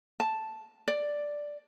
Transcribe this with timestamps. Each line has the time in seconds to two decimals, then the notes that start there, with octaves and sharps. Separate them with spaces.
0.20 A5
0.88 D5